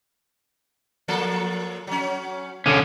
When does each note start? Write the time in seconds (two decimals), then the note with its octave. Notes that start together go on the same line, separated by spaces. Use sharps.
1.08 F3 A#3 A4
1.87 F#3 C#4
2.66 D3 C#4